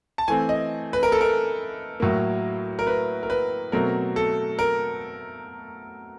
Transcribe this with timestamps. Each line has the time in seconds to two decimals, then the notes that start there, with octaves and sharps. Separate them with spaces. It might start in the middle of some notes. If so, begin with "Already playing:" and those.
0.18 A5
0.28 E3 A3 C4 G#5
0.49 D#5
0.93 B4
1.03 A#4
1.12 A4
1.21 A#4
2.00 A2 F#3 A#3
2.79 A#4
2.87 B4
3.23 A#4
3.30 B4
3.72 B2 F#3 A3 C4 A#4
4.16 A4
4.59 A#4